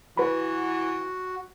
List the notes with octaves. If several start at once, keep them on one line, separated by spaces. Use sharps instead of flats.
E3 F#4 B4 B5